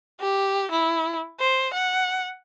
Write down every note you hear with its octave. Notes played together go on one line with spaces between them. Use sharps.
G4
E4
C5
F#5